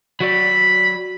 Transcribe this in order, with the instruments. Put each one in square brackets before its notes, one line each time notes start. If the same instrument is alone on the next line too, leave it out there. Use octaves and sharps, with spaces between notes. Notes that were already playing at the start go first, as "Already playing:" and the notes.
[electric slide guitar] F#3 F#4 D5 [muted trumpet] B5